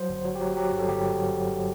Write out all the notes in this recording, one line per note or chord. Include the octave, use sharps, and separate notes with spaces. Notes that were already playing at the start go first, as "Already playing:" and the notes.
Already playing: F#3 C5
G1
F#3
G4
F#3
F#3 G4
G2
A4
G1 G4